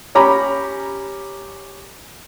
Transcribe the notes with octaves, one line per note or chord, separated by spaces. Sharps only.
C#4 G4 A#5 B5